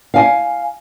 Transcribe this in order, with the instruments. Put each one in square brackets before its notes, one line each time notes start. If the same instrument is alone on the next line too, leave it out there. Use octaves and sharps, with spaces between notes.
[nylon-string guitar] F5 G#5